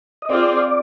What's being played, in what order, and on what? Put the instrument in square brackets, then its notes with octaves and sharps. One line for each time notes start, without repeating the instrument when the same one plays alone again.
[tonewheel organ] D#5
[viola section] C4 F4 G#4 [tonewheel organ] D5